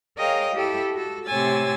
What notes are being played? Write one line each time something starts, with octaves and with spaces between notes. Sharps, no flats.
G#4 A#4 C#5 D#5 F5 G5
E4 G4 A4
F#4 A4
A2 C3 C#5 G#5 E6 A6